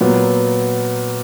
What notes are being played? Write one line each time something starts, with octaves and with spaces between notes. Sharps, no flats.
A#2 F#3 B3